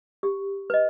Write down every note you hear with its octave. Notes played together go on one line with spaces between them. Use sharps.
G4
B4 D#5